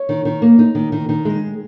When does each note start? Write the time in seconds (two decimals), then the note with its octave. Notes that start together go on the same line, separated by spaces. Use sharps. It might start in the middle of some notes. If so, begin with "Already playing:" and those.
Already playing: C#5
0.09 D#3
0.25 D#3
0.42 A#3
0.59 D#4
0.75 D#3
0.92 D#3
1.09 D#3
1.25 G#3